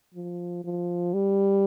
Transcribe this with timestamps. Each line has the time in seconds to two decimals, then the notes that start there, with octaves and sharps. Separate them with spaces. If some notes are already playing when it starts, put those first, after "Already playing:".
0.15 F3
0.64 F3
1.14 G3